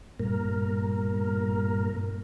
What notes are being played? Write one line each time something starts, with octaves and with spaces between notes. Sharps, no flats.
G2 A#2 A#4